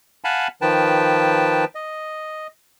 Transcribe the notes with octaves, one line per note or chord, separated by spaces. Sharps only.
F5 F#5 G#5 A5 B5
D#3 F3 B4 G5 A5
D#5